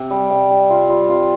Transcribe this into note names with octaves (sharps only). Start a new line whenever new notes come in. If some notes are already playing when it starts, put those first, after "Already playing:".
Already playing: C3
G3
C3
G3
C3 F4
G3 F4
C3 F4